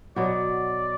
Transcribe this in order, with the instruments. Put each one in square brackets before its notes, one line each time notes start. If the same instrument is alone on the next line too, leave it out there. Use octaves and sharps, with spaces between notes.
[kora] B2 F#3 B3 F#4 [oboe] D5